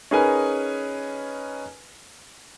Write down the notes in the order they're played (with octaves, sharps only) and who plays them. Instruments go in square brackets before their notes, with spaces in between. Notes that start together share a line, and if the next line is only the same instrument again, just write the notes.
[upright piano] C#4 D#4 G#4 A#4 B4 G#5